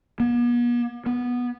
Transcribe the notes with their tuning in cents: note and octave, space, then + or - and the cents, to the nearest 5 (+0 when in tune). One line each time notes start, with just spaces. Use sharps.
B3 -45
B3 -10